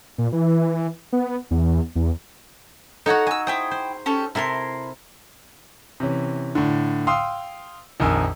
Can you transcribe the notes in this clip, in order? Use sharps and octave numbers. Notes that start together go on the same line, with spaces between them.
A#2
E3
B3
E2
E2
D#4 F#4 A4 C#5 F#5
G#4 D#6 E6
E4 C5 G5 D#6
C5
C#4 G4 A4
C3 E4 A4 A#4 C6
C3 E3 C#4
A2 D3
F5 G5 C6 D#6 E6
A#1 F2 D#3 A#4 G#5 E6